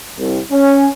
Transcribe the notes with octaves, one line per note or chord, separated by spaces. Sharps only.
C2
C#4